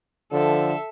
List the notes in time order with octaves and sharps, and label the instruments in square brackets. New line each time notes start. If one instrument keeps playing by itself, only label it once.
[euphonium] D3 [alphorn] F3 [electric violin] A4 E5